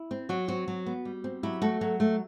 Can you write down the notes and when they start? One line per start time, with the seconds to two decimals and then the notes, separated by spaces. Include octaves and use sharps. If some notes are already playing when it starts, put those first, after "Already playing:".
Already playing: E4
0.11 C4
0.29 F#3 F#4
0.48 C4 F#4
0.68 F#3
0.86 B3
1.05 G3
1.24 C4
1.43 F#3 E4 G4
1.62 A3 F#4 A4
1.81 F#3 F#4
2.00 A3